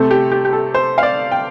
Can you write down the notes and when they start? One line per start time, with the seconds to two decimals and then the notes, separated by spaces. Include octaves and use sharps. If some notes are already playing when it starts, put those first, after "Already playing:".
Already playing: C3 A3 C4 A4
0.11 G4
0.32 G4
0.45 G4
0.53 A4
0.74 C5
0.98 F5
1.03 D5
1.32 G5